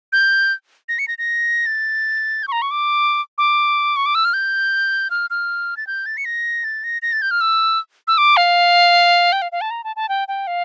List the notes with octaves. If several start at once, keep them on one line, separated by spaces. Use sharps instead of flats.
G6
A#6
C#7
A#6
A#6
A6
G6
C#6
A#5
C#6
D6
D6
C#6
D6
E6
F6
G6
F6
F6
A6
G6
A6
C#7
A#6
A6
A#6
A#6
A6
G6
F6
E6
E6
D6
F5
G5
F5
F5
A5
A#5
A5
A5
G5
G5
F5